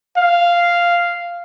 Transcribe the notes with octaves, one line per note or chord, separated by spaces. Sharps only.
F5